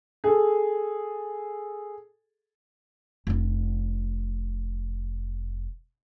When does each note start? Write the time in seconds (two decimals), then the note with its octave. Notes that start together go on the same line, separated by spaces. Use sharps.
0.24 G#4 A4
3.27 F1 D4